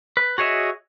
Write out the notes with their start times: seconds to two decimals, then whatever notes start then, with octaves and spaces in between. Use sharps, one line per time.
0.17 B4
0.38 F#4 G#4 C#5 D#5 E5